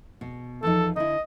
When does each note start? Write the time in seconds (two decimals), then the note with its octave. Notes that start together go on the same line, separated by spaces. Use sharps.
0.21 B2
0.63 E2 F3 D#4 A4
0.96 D3 E4 D#5